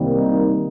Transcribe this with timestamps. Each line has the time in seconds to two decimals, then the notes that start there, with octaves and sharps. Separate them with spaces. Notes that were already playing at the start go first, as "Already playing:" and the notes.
Already playing: C2 C3 D#3 G3 A#3
0.15 D#4